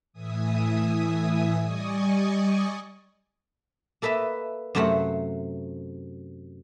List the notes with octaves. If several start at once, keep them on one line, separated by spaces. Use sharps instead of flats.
A2 E3 E5 G#5 D#6
G3 D5 D#5 G#5 C#6 D#6
A#3 A4 B4 D#5 E5
F#2 C3 A3 C5 F#5